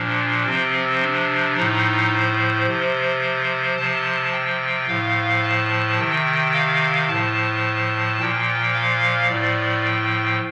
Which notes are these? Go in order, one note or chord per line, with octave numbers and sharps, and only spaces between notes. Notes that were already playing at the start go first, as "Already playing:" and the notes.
Already playing: A#2 F3 D4
C3 F3 C4
D4
A2 F3 D#4
C5
C3 F3
C3 F3 A5
G5
A2 F3 F5
A5
C3 D#3 G5
F5
A2 F3 A5
A#2 F3 G5
F5
A2 F3 D5
G5